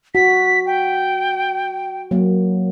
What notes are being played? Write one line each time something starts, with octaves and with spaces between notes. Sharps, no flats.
F#4 B6
G5
F#3 A#3